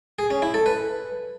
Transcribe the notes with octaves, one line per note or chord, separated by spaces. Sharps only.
G#4
C#4
E4
A4
B4